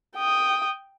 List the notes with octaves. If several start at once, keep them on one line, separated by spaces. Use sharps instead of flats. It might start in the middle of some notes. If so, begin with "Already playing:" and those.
G5 D#6